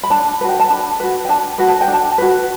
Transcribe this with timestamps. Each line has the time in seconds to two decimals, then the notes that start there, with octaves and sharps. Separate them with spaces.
0.03 B5
0.10 D4 A5
0.41 B4
0.44 F#4
0.49 G5
0.60 A5
0.70 D4 B5
1.00 F#4 B4
1.25 G5
1.29 D4 A5
1.58 F#4 B4
1.68 A5
1.81 G5
1.88 D4 A5
2.18 F#4 B4